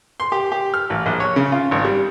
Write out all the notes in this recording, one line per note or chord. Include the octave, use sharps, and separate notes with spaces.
C6
G4
G4
F6
A1
A#1
C#5
C#3
F4
G#1
G3